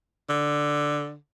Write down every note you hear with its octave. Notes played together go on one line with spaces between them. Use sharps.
D3